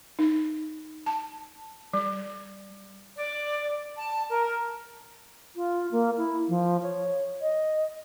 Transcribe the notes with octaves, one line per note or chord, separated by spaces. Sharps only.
D#4
A5
G3
D5
A5
A#4
F4
A#3
E4
F3
C#5
D#5